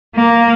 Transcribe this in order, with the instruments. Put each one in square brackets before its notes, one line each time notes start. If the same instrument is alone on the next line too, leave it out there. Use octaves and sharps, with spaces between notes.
[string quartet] A#3